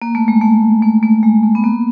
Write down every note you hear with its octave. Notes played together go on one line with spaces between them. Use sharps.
A#3
A3
G#3
A3
A3
A3
G#3
A3
B3
A#3